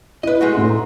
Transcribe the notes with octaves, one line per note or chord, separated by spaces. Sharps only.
E4 B4 D#5
G#3 A3 F#4
A2 C6
A#5